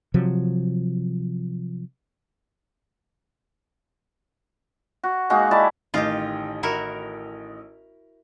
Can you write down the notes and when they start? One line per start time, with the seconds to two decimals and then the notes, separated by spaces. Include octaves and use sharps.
0.14 C3 F3 F#3
5.04 F#4
5.30 G#3 A#3 D#4 F#4
5.51 E4 G4 D5 A5
5.94 A1 D#3 F4 G4 D#5
6.63 E4 F#4 A#4